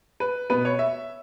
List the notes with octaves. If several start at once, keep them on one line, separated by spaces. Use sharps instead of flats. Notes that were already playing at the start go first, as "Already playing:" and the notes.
B4
B2 B3 B4
C#5
E5